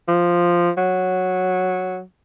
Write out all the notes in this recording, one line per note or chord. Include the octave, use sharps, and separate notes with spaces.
F3
F#3